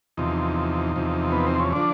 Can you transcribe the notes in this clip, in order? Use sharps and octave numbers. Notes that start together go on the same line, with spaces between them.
E2 C3 F3 D#4
E2 C3 F3
B3
C4
C#4
D3 F3 D4